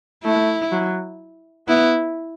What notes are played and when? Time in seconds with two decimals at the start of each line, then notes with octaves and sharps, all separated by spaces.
0.24 A3 E4
0.72 F#3
1.68 B3 E4